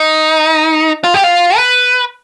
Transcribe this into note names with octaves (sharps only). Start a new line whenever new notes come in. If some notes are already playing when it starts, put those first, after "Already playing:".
Already playing: D#4
F4
G4
F4
B4